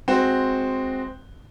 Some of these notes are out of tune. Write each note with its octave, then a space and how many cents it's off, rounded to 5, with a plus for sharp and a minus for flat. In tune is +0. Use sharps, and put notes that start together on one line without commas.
G#3 +10 C4 +0 F#4 +0